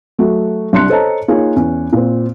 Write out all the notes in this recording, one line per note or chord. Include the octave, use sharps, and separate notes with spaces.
F#3 A3 F#4
C2 D4 C6 F#6 C#7
A4 C5 C#5 D#5 A5 A#5
A#3 D#4 F4 G#4 C#5
E2 C#4
A#2 C4